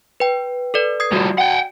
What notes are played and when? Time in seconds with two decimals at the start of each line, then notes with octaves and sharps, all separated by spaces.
0.20 B4 G5
0.74 A4 B4 D5
1.00 D#6 G#6 C7
1.13 F3 G3 F#4 D5
1.38 F#5 G5